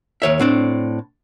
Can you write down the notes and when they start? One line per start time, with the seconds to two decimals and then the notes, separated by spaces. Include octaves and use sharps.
0.22 D#2 C#5 E5
0.39 A2 C4 D4